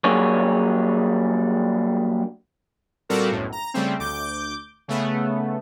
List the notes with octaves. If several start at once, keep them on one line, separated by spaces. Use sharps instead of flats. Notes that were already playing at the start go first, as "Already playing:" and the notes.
F#3 G3 A#3 D4 G#4 C#5
A#2 G3 C4 F#4 A4 A#4
B1 F#2 A2
A#5
C#3 G3 A3 C4
D2 D6 G6
C#3 A3 B3